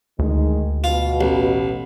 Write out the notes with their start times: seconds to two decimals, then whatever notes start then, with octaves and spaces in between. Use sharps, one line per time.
0.19 D2 D#3 G#3
0.84 B2 F4
1.21 A1